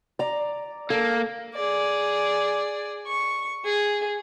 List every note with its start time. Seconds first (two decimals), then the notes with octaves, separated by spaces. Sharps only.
0.19 D5 A#5
0.90 A#3 A4
1.55 G#4 D5
3.07 C#6
3.65 G#4